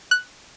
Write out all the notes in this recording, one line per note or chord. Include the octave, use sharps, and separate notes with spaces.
F#6